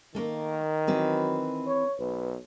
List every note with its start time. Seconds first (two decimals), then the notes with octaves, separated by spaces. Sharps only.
0.15 D#3 A3 A#3 A#4
0.87 E3 F#3 C4 B4
1.67 C#5
1.99 B1 B4